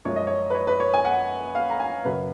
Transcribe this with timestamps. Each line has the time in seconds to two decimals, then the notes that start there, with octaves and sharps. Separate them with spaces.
0.05 F#2 F3 G#3 C#4 F4 C#5
0.16 D#5
0.27 C#5
0.50 B4
0.55 C#5
0.67 B4
0.80 C#5
0.94 G#5
1.05 F#5
1.55 F5
1.70 A#5
1.80 G#5
2.05 F#2 C#3 F#3 B4